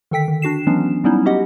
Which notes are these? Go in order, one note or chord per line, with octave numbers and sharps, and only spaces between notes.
D3 D#3 A4 G5 B6
D#3
D4 F#4 C7 E7
E3 F#3 G#3 B3 C#4 D4
F#3 G3 B3 C#4 D#4 E4
C#4 F#4 G4 D#5 F#5